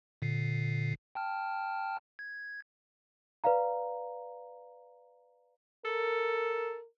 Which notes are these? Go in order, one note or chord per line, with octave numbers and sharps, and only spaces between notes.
A#2 D3 C7
G5 A5 F6
G#6
B4 D5 F5 A#5
A4 A#4